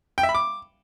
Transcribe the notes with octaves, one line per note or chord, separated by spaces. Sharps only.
G5
E5
B5
D6